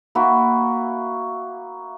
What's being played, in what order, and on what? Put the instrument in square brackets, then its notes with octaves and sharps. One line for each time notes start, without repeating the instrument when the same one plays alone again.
[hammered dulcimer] A#3 E4 F#4